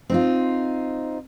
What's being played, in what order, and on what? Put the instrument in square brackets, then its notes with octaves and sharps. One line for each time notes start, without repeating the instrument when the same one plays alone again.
[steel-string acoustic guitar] C4 D#4 F4